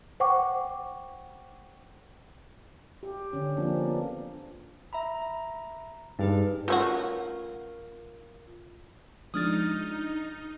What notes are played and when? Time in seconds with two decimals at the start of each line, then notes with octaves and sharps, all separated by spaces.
0.20 C5 F#5 G5 C#6 D6
3.03 G4
3.33 D3 C#4
3.57 F3 A#3 C4 D4
3.81 B3
4.93 E5 A#5 B5
6.19 G2 D#4 G#4 B4
6.68 A3 C#4 F4 F#4 A#4
9.34 F3 G#3 D4 D#4 D#6 F6 A6